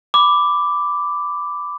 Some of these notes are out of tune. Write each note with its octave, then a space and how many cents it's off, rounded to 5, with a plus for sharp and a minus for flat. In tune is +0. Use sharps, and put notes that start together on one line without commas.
B5 +15 D6 +0